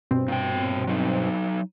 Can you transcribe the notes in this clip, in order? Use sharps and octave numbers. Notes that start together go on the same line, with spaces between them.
G2 B2 C4
A#2 G5
F#3 D#4